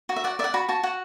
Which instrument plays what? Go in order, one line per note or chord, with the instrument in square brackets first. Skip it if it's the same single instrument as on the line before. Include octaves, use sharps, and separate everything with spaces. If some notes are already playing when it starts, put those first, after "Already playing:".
[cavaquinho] F#4
E5
D5 F#5
D5 E5
F#5
F#4 B5
F#4 A5
F#4 F#5